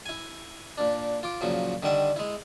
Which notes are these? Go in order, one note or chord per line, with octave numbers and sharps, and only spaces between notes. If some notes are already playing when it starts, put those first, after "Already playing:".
E4 G#5
A#2 D4
F4 D6
A#2 C#3 F3 F#3
D3 D#3 G3 E5 F#5
G#3 E4